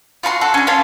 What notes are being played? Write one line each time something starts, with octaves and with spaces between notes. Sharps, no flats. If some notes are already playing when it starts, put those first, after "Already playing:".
F4 F#4 B5 C6
F#4 A4
C#4 D4
C#4 F4 F5 A5